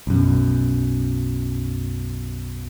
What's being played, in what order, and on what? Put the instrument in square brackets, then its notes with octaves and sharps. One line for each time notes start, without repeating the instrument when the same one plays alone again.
[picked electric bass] B1 F#2